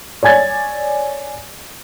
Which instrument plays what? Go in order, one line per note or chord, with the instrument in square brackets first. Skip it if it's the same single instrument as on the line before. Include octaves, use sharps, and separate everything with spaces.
[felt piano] C#5 D5 G#5 G#6 A6